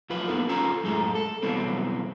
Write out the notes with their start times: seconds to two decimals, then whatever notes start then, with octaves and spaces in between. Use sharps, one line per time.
0.10 F2 F#3 F4 B4
0.27 A#3 B3 D#4 F#4 A4 A#4
0.48 C#4 F4 A4 A#5
0.83 F#2 A2 G#3 A4 A#5
1.15 A4
1.43 B2 E3 F#3 G3 B3 C4